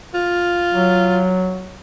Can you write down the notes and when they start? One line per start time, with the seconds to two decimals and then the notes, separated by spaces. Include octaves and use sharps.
0.14 F4
0.74 F#3